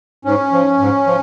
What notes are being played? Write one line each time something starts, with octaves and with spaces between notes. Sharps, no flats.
G#2 C#4
F3
G#2
F3